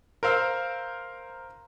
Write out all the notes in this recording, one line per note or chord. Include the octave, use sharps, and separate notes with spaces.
A#4 C5 F5 E6